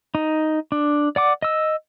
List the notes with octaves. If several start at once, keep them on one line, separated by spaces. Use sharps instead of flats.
D#4
D4
D5 F#5 D6
D#5 E6